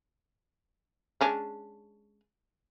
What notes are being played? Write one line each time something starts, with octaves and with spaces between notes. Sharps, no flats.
G#3 C#4 D4